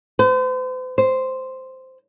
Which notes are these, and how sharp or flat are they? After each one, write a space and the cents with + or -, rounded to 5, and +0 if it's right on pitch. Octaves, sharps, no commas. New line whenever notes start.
C5 -45
C5 -5